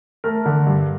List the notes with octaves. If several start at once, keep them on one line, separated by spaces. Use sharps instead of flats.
A3 A#4
D3
G2